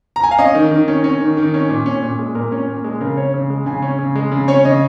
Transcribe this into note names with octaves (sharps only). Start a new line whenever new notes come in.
A#5
G#5
F5
C#4 D#5
D#3
D#3
C#4
C#4
D#3
D#3
C#4
A#2
C#4
A#2
G#3
A#2 A#4
C#4
A#2
G#3
C#3 A#4
C#4 C#5
C#3
G#3
C#3 G#5
C#4
C#3
G#3
C#3
C#4 C#5
C#3 D#5